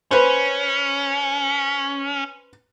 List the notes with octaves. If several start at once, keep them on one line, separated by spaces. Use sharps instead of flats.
C#4 B4 C5